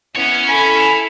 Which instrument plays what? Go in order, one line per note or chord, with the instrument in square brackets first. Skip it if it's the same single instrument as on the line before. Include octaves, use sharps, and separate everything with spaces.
[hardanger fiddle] B3 E4 [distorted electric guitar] C#4 C#5
[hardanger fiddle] E4 A4 [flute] G#5 [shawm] B5